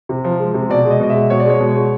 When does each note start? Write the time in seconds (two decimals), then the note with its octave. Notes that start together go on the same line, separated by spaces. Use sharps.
0.09 C3
0.24 F3
0.40 G#3
0.54 C3
0.69 B2 D5
0.85 G#3 D#5
1.00 B2 D#5
1.10 E5
1.15 G#3
1.30 B2 C#5
1.40 D5
1.46 G#3 C#5
1.60 B2
1.75 G#3